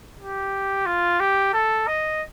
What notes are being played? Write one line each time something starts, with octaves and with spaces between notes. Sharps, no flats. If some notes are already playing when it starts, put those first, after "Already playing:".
G4
F4
G4
A4
D#5